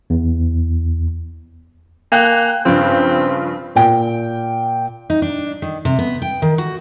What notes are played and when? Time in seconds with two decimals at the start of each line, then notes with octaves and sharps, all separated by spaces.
0.10 E2
2.12 A#3 G5 G#5 F#6
2.65 G2 C#3 F3 C4
3.76 A#2 G5
5.10 D#4
5.22 D4
5.62 D#3
5.85 C3
5.99 B3
6.22 G5
6.42 D#3
6.58 F#4